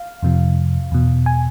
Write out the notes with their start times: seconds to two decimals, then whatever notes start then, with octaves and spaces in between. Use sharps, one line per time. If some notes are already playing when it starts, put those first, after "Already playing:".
Already playing: F5
0.22 F2 C3 F3
0.92 E2 B2
1.26 G#5